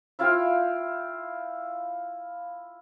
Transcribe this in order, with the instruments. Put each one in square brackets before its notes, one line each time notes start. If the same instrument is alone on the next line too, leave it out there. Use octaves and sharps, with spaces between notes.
[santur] E4 F4 F5 G5